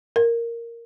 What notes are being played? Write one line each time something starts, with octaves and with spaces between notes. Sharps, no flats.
A#4